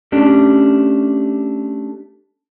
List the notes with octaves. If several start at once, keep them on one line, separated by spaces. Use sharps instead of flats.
A3 C#4 D4 G4